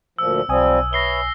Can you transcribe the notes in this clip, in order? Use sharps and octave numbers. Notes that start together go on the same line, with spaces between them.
D2 A#2 F3 E6
B1 F3 G3 C4 G#5 D#6
B4 C#5 E5 A#6 C7 G7